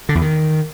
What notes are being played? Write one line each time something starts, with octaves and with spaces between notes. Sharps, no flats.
D3
E2
D#3